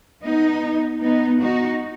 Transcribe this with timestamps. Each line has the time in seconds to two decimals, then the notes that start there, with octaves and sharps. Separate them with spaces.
0.23 B3 D#4
1.02 B3 D#4
1.41 D#4 F#4